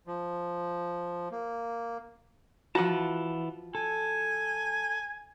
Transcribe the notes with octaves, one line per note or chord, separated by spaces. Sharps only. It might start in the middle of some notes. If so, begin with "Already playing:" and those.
F3
A#3
E3 F3 F4 F#4 F#5 A5
A4 G#5